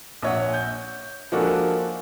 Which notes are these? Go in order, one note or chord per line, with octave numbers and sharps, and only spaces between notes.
A#1 C#5 F#5
G6
F3 G#3 A#3 D4 F#4 A4